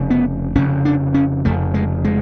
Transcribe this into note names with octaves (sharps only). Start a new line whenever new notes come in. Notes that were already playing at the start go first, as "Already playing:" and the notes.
Already playing: F1 C#3
B3
F1 F2 C#3 C#4
D4
C#4
F1 F2 C#3 A3
G#3
G#3